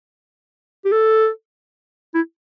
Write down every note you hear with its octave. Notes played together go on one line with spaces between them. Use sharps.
G4
A4
E4